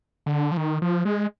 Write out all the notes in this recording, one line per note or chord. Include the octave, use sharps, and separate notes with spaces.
D3
F3
D#3
F3
G#3